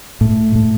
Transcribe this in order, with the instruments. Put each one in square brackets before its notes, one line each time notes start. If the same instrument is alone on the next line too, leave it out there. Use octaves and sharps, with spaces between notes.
[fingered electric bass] A2
A2